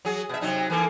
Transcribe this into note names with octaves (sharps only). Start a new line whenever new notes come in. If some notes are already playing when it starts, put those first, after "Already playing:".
F#3 G#4
B2 E5
C3 F#3 D#4
E3 A#3 A4